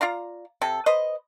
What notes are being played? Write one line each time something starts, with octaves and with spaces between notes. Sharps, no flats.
F4 D5 F5 A#5
C3 A4
B4 C5 D#5